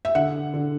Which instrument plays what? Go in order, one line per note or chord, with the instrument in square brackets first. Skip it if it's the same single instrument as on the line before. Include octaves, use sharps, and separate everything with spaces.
[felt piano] E5
D3 F#5
D3